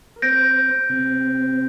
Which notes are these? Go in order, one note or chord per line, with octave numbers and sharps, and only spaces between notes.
A#4
C4 C5 G6 A#6 D7
C3 C4